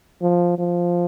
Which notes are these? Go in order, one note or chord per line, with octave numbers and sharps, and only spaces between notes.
F3
F3